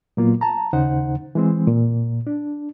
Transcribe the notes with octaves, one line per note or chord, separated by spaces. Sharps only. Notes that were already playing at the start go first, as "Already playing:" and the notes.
A#2 F#3 A#3 B3 F4
A5 A#5
D#2 C#3 D#4 C5 F#5
E3 G#3 C4
A#2
D4